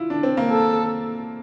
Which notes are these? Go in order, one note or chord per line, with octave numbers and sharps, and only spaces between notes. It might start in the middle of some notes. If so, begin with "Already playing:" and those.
Already playing: E4 F4
D4
C4
A#3
A4